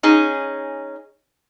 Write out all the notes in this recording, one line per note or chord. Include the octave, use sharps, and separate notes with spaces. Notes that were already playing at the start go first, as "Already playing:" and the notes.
C#4 D#4 G#4